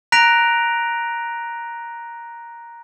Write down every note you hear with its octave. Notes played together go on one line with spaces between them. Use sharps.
A#5 F#6 A#6 B6 D7 F7